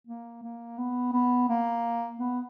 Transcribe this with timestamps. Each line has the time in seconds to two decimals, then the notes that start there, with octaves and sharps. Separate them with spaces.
0.07 A#3
0.43 A#3
0.78 B3
1.13 B3
1.49 A#3
2.19 B3